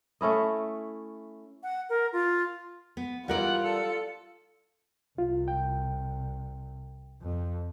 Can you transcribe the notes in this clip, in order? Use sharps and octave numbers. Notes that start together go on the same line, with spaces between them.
A3 C#4 E4 D#5
F#5
A#4
F4
B3
G#2 E3 G3 F4 A#4 D5 F#5
A4 C#7
C2 F4
G5
F2